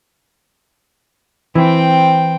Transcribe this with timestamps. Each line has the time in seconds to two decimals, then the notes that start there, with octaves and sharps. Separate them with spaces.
1.55 E3 C4 G5